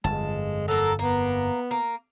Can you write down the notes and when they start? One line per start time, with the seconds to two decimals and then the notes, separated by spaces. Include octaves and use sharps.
0.04 G1 F2 G#3 A5
0.68 F#3 A#3 A4
0.99 A#3 B3
1.71 A#3